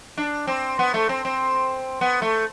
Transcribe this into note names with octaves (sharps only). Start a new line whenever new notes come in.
D4
C4
B3
A3
C4
C4
B3
A3